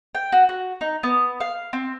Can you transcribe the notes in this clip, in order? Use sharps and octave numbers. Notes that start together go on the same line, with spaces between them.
G5
F#4
F#4
D#4
B3
F5
C4